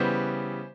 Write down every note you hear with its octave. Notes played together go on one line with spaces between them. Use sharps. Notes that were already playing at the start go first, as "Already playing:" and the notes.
Already playing: C#3 E3 G3 B3 C5